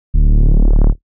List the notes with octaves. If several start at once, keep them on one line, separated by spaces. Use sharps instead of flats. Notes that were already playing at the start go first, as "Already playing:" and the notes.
D1